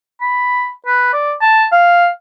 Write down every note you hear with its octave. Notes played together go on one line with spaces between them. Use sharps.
B5
B4
D5
A5
F5